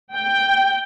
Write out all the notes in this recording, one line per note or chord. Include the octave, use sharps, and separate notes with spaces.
G5